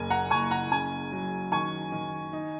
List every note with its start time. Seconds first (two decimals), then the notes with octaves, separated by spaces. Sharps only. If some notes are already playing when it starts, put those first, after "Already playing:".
Already playing: F#1 A#3 G#5
0.10 F#5 A#5
0.30 F#1 G#5 C#6
0.51 F#5 A#5
0.71 C#3 G#5
1.12 F#3
1.52 D#3 G#5 C#6
1.92 D#3
2.33 D#4